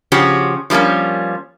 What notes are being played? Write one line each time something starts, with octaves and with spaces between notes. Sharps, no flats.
C#3 F3 C#4 F#4 G4
F3 G3 G#3 A#3 C#4